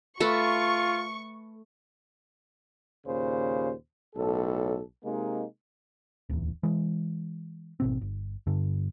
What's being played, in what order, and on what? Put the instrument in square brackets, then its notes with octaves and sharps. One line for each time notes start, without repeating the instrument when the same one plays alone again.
[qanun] A3 A4 B4 [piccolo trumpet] F4 [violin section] C#6
[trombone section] D#2 A#2 C#3 C5
B1 A2 A4
C3 G#3 A#3 D#4
[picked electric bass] D1 E2
E3 G#3
G#1 B2 C4
G1
G2 D3